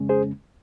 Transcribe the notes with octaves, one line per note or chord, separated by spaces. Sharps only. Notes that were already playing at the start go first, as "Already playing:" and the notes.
Already playing: F2 C#3 G#3 C#4
G#4 C5